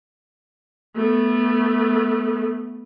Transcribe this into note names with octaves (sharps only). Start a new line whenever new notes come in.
A3 B3